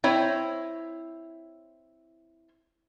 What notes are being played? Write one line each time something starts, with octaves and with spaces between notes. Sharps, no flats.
C4 E4 C5 C#5